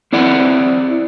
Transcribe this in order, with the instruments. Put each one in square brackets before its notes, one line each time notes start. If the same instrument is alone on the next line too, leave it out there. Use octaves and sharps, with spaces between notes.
[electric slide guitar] C4 E4 D5 F#5